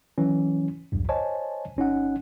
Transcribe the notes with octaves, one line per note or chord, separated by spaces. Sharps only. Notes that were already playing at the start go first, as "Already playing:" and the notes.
E3 F#3 C#4
B1 E2 G2
C5 C#5 D#5 G#5 A5
G1 C#4 D#4 F#5